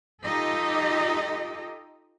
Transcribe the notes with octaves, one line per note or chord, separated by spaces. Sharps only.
D#4 F4 G4 A4 D#5